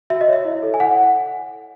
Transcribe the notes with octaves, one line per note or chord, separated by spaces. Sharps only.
F#4 E5
D#5
C#5 E5
E4
A4 C#5
G#5
E4 F#5